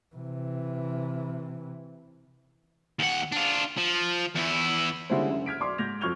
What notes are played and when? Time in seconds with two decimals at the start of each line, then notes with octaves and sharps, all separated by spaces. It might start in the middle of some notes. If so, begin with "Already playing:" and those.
0.16 C3 E3
2.99 D#2 F#5
3.32 D4 F4
3.77 F3
4.35 E2 E4
5.10 D3 G3 G#3 C#4 E4 C5
5.30 F#1
5.46 F6 G#6 B6 D7
5.60 B1 D5 C6 D6
5.78 G#2 G6 G#6 A#6 F7
6.01 F2 C#6 F6 G#6 F7 G7